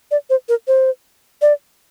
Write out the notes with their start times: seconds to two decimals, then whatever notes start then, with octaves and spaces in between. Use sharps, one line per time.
0.11 D5
0.30 C5
0.49 A#4
0.68 C5
1.42 D5